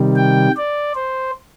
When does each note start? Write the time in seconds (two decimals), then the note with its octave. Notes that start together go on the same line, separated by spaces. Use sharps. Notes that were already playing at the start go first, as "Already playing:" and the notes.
Already playing: C3 D#3 G3
0.16 G5
0.57 D5
0.95 C5